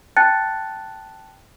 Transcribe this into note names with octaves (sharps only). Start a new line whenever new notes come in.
G5 A5 F#6 A6 C#7